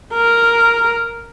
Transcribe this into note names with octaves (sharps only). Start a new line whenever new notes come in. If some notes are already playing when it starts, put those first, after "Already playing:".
A#4